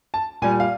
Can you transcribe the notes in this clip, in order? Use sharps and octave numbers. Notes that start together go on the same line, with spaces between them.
A5
A#2 G3 G#5
F5